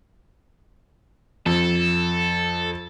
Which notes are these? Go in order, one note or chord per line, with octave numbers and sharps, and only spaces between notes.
F2 A4